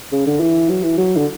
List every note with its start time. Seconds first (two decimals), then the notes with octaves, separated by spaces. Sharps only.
0.12 C#3
0.27 D3
0.40 E3
0.69 F#3
0.83 E3
0.98 F#3
1.17 D3